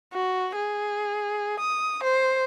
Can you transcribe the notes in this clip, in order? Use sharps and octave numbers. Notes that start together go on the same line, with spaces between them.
F#4
G#4
D#6
C5